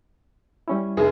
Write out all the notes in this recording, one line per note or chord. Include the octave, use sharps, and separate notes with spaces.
G3 C#4 E4
F1 C2 G#4